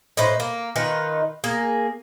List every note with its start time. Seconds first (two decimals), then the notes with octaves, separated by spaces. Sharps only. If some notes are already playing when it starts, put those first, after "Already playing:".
0.17 A2 D#4 B4 C5
0.40 A#3
0.76 D#3 D#4 F4 B4
1.44 A#3 G#4